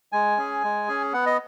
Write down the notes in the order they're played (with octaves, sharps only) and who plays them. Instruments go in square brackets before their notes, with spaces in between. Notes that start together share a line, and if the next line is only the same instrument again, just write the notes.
[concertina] G#3 G#5
C#4 G#4
G#3
C#4 G#4
B3 F#5
D#5